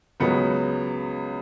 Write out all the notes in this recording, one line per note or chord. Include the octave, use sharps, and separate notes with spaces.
C#2 C#3 F#3 B3